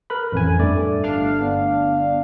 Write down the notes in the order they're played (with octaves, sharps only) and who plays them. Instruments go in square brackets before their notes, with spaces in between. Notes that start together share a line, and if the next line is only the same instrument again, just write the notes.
[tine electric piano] A#4 B4 B5
A1 F2 G#5
G2 A3 D5
[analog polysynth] G1 D4 F5
[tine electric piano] B3